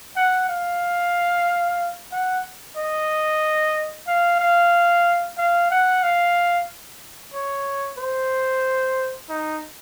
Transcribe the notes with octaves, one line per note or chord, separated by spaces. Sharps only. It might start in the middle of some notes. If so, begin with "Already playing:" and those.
F#5
F5
F#5
D#5
F5
F5
F5
F#5
F5
C#5
C5
D#4